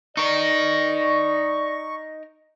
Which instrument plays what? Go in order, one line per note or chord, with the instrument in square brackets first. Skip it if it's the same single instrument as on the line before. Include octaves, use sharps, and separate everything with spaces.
[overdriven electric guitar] D#4 A#4 [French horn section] D5 [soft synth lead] C#6